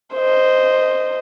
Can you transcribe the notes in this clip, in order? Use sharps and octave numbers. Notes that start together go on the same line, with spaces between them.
C5 D#5